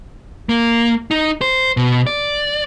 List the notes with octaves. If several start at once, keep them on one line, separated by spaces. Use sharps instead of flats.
A#3
D#4
C5
B2
D5